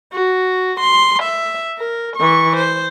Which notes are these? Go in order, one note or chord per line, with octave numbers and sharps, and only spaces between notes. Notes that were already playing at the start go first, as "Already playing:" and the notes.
F#4
C6
E5
A#4
E3 C#6
C5